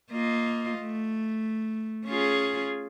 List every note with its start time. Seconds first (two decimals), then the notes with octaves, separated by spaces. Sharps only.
0.11 A#3 F4 D#5
0.79 A3
2.07 C#4 F4 G#4